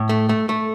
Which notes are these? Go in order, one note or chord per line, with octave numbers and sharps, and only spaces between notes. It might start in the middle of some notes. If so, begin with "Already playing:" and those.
Already playing: A2
A3
A3
A3